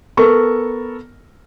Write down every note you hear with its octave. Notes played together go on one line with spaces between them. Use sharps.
B3 A4 A#4 C#6